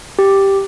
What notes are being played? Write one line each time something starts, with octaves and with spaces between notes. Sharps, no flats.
G4